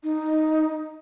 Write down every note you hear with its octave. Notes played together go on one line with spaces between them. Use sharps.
D#4